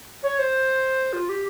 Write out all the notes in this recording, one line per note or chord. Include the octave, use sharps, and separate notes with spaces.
C#5
C5
F4
G4